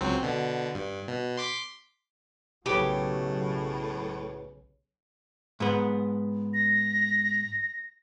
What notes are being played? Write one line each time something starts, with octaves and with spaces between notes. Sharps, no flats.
C#2 F#3 C4
B2 D3
G2
B2
C6 D6 B6
B1 A2 C#3 F#3 G4 G#4 B4 C#5
G#2 B3
A#6